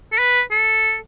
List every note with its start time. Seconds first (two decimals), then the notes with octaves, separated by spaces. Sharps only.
0.12 A4
0.19 B4
0.51 A4